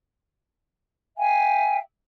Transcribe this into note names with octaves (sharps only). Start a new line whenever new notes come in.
E5 F5 G5 G#5